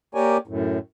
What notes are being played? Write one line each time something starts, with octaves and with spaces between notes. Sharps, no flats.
A#3 G4 A#4 C#5 D5 G#5
F#2 A2